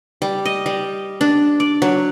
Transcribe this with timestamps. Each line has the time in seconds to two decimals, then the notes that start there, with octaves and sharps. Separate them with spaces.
0.22 G3
0.45 D#5
0.66 G3
1.21 D4
1.60 D5
1.82 F#3